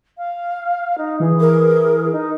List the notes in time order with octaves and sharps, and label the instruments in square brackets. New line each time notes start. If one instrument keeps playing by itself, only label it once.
[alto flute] F5
D#4
[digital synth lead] E3 [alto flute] G#4
[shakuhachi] A#4
[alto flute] D#4